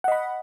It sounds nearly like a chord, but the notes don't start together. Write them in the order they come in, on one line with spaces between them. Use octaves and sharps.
F#5 D#5 B5